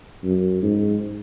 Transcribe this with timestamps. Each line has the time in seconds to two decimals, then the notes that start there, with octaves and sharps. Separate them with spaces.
0.24 F#2
0.63 G#2